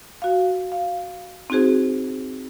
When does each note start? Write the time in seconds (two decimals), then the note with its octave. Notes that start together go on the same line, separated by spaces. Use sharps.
0.22 F#4 F5
0.72 F5
1.50 C4 D#4 F#4 G#4 C5